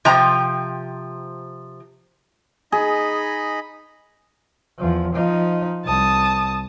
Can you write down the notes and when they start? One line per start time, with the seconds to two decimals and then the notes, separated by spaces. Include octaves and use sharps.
0.05 C3 F3 G5 A#5
2.72 D#4 G#4 D#5 B5
4.78 E2 F3
5.14 F3 D#4
5.85 C2 A5 D#6